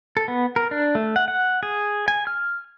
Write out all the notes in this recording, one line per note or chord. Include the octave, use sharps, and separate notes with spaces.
A4
B3
A#4
D4
A3
F#5
F#5
G#4
G#5
F6